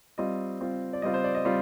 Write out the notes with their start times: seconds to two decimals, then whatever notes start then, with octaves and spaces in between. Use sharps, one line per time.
0.18 G3 C4 F4 D#5
0.60 G3 C4 F4
0.93 D5
1.02 G3 C4 F4 D#5
1.14 C5
1.24 D5
1.35 D#5
1.45 G3 C4 F4